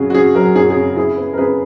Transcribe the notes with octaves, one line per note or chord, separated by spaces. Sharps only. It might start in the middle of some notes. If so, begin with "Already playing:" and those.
Already playing: F#2 C#3 F#3 C#4 F#4 G#4
F#4
C#4 G#4
F#3 F#4 A#4
F#2 G#4
G#4
C#3
E4 G#4
B3
A#4
C#3 G#4 B4